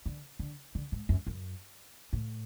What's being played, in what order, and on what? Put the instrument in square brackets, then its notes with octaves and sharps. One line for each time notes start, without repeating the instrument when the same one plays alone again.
[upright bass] D3
D3
D3
G#2
F#2
F#2
A2